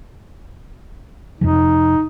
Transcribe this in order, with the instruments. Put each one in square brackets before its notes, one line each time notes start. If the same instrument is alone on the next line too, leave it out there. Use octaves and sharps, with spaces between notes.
[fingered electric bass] F2 C3 F3 [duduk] D#4